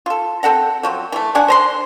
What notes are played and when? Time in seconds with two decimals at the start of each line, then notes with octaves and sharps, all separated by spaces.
0.06 F4 A4
0.43 C4 A4 F#5 A#5
0.83 F3 F#3 C4
1.12 E3 A3
1.35 D4 D5 F#5 G#5
1.48 C5 A#5 C6